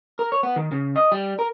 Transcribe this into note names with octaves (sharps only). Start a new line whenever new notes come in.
A#4
C#5
B3
D#3
C#3
D#5
G3
A#4